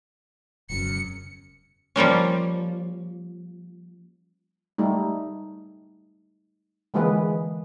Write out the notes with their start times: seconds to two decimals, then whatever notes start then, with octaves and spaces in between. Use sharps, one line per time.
0.70 E1 F#2 C#3 C#7
1.96 F3 G3 A#3 C#4
4.78 G3 A3 D#4
6.94 D3 E3 G#3 A#3 G#4 B4